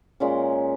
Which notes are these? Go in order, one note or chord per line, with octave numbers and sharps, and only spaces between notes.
A#2 G#3 C#4